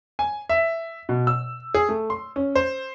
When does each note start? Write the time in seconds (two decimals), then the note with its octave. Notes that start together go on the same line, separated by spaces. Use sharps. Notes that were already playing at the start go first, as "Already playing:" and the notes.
0.19 G#5
0.49 E5
1.09 B2
1.27 E6
1.74 G#4
1.89 A3
2.10 C6
2.36 C#4
2.55 C5